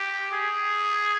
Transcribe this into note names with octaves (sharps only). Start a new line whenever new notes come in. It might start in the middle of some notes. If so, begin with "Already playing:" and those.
Already playing: G4
G#4